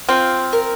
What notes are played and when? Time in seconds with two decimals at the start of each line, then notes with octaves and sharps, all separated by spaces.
0.09 C4 F4
0.53 A#4